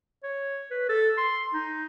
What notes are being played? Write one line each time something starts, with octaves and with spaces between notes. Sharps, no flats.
C#5
B4
A4
C6
D#4